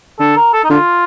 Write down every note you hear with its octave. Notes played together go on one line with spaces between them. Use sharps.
D3 A4
A#4
A4
D#4
D3 F4